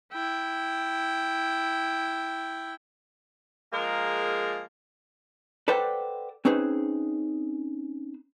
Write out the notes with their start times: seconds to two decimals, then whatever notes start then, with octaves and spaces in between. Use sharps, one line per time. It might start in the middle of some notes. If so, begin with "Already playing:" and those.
0.12 E4 G5
3.73 F3 G#3 A#3 G#4 A#4
5.68 A4 B4 C5 D5 F#5 G5
6.45 C4 C#4 D#4 G#4 B4 C5